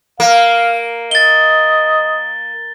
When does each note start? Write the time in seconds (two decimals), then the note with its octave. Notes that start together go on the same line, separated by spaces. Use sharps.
0.20 A#3 F5
1.11 D#5 A6 G7